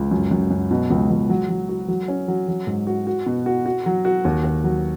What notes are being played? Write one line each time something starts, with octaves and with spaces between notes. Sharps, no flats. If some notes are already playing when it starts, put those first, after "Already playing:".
Already playing: C#2
F#2
F#2
F#2
B2
C#2
C#2
F#3
F#3
F#4
F#3
C#4
F#3
F#3
G#2
F#4
F#4
B2
F#4
F#4
F#3
F#4
D#2
D#2
F#3